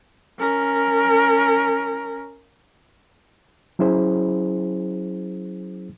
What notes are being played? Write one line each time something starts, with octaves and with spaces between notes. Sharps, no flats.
C#4 A#4
F#3 C#4 E4 G#4 C5